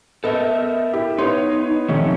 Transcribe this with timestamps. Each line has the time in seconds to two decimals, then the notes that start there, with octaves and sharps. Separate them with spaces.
0.24 B3 A4 A#4 D#5 E5
0.93 E4 G4
1.18 B3 D#4 C#5 C6
1.88 C3 D#3 F3 A3 C#4